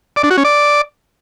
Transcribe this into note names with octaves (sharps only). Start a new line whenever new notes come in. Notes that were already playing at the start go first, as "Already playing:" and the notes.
D5
D4
F#4
C#4
D5